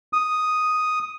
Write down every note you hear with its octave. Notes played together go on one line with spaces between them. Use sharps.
D#6